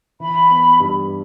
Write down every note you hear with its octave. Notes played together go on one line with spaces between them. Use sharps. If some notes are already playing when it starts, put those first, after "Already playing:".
E3 B5
B3
G2